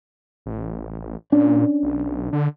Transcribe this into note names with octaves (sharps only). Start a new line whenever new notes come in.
A1
A#2 C#4 D4
B1
D3